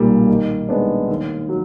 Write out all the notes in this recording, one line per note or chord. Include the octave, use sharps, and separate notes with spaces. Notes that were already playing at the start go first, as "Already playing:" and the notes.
Already playing: B1 A#2 G3 A#3
D#3
G#3 B3 D4
D#2
F#3